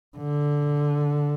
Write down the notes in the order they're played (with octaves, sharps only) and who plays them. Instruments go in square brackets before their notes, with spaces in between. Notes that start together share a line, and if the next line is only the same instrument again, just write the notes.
[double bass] D3